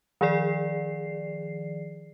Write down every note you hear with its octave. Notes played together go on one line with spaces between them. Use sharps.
D#3 F3 G#4 D5 C7